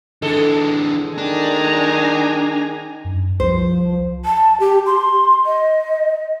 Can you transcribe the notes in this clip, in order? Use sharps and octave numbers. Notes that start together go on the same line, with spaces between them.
D3 E3 G#3 A4
D#3 D4 G#5 A#5
F#2
C2 F3 C5
A5
G4
C6
D#5